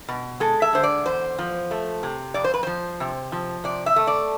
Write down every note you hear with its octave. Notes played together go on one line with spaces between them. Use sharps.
B2
G#3 A4
E5
D3 C5
D5
E2 C5
F3
A3
C3
F2 D5
C5
B4
F3 C5
C3
F3
C3 D5
E5
A3
D5